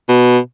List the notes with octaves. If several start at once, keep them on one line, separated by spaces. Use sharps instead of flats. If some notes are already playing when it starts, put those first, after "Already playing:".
B2